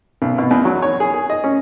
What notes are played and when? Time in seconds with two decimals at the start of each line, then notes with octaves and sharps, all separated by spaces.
0.22 B1
0.38 B2
0.51 E2
0.65 F#3
0.82 C#5
1.00 G#4
1.14 G#4
1.30 D#5
1.44 C#4